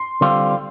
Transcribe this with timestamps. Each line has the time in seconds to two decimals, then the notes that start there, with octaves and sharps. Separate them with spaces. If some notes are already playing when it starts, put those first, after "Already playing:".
Already playing: C6
0.21 D3 G3 C4 F4